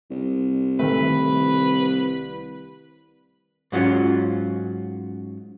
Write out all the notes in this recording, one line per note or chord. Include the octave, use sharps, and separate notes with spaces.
C2
D#3 A3 B4
G#2 F#3 C#4 F4